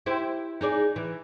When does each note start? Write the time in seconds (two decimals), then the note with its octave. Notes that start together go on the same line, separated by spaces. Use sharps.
0.06 E4 G4 C5
0.61 D#4 G#4 D5
0.96 E3